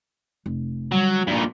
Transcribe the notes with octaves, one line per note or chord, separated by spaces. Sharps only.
F1
D3 F#3 G3
G2 A#2 F3